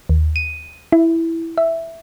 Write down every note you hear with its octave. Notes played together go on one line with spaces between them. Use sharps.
D#2
D#7
E4
E5